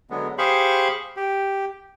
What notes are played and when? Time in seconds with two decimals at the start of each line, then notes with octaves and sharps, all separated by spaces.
0.10 D3 F#3 G#3 B3
0.38 G4 G#4 C5 F5 B5 C#6
1.17 G4